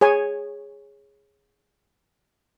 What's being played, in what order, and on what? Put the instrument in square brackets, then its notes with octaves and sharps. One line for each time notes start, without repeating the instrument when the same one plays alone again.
[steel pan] G#4 C#5 G#5